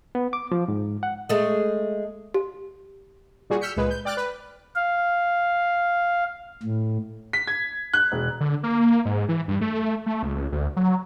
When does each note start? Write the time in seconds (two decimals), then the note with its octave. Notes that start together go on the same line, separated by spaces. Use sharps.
0.15 B3
0.33 D6
0.52 F3
0.68 G#2
1.03 F#5
1.29 G#3 A3
2.34 G4
3.50 A#2 G3 F#4 G#4
3.61 E6 F6 G6 B6 C#7
3.76 C#2 A#2 G#3 B4
3.91 G6
4.05 D5 G5 D6 F6 F#6 A6
4.17 B4
4.76 F5
6.63 A2
7.33 B6
7.47 G#6
7.94 F#6
8.12 E1
8.40 D3
8.63 A#3
9.05 G#2
9.29 E3
9.48 G2
9.61 A3
10.06 A3
10.23 C#2
10.52 D2
10.77 F#3